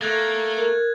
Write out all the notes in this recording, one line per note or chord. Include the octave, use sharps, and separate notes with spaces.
A3 A#3 F#6 G#6 A6
A#4